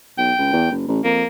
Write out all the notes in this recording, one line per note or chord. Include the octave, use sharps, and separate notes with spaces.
B1 G5
C#2
E2
F#1
A1
F2 A#3